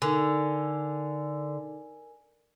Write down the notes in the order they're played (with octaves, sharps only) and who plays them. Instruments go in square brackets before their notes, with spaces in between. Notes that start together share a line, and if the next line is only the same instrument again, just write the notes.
[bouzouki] D3 [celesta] D#4 A4 F7 [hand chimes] A#4 G#5